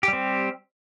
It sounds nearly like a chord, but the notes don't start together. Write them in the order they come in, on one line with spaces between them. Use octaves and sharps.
G4 G3 C4